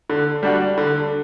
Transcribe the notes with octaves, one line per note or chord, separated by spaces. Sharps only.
D3
G3 D4 F#4
D3